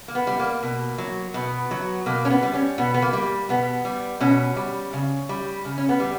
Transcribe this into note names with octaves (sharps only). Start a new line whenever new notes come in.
A#3
B3
G3
A#3
B2
F#3
B2 B3
F#3
B2 A#3
C#4
B3
G3
C#4
B2 B3
B3
A#3
G3
B2 B3
G3
B2 C#4
G3
C#3
G3
C#3
C#4
B3
G3